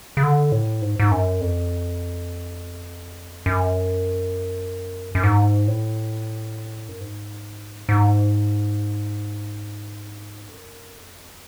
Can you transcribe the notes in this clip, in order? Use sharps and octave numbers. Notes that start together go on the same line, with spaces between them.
C#3
D3
A2
G#2
G#2
F#2
F2
F#2
F#2
G#2
A2
F#2
G#2
G#2
F2
F#2
F2